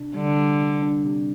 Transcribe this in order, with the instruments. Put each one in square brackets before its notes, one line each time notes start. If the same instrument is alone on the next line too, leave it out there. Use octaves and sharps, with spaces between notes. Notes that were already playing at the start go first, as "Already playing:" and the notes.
Already playing: [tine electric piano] C3 D4
[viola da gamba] D3 [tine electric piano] G3
[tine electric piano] G3
C3
D4
C3